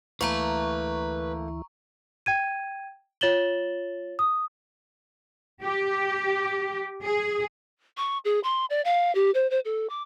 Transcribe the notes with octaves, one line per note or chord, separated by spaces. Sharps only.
D2 E3 A3 A#3 E4 B4 A#5 C#6
G5 G#6 D#7
F4 C#5 A6 E7 F#7 G7
D#6
G4
G#4
C#6
G#4
C6
D5
F5
G4
C5
C5
A4
D6